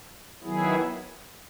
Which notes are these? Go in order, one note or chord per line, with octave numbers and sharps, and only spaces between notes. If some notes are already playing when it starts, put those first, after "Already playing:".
D#3 F#3 B3 E4 G#4